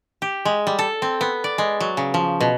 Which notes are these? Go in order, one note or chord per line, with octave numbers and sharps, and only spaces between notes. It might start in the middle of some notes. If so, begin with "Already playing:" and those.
G4
G#3
G3
A4
C4
B3
D5
G#3
F#3
C#3
F3
B2